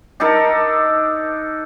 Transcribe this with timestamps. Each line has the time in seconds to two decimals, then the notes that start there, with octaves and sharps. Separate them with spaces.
0.20 D4 D#4 A4 A#4